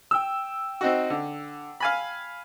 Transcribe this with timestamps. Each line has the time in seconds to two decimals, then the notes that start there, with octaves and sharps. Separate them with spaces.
0.11 G5 E6
0.81 C4 D#4 F#4
1.10 D3
1.80 F5 G#5 B5